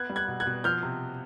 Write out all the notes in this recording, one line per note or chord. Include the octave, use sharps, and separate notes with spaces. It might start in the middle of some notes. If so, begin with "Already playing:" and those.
Already playing: B3 F#6 G#6
G3
F#6 G#6
B2
F#6 G#6
B2
F3 F6 G6
C3